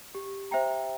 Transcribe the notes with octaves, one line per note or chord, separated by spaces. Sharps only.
G4
C5 E5 G5 A#5